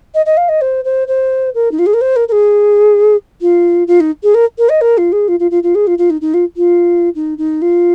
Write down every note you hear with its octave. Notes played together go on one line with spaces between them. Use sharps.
D#5
D#5
F5
D#5
C5
C5
C5
A#4
D#4
F4
G#4
A#4
C5
A#4
A#4
G#4
F4
F4
D#4
G#4
A#4
A#4
D#5
A#4
F4
G#4
F4
F4
F4
F4
G#4
F4
F4
D#4
D#4
F4
F4
D#4
D#4
F4